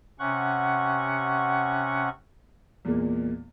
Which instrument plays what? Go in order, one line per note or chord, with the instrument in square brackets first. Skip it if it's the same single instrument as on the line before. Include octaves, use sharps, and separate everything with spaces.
[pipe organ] C3 C#4 F#5 C#6
[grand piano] E2 A#2 G#3 A#3